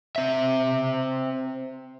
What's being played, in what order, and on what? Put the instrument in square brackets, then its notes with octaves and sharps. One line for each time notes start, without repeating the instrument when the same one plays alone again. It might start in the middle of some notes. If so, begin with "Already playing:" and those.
[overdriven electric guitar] C4 E5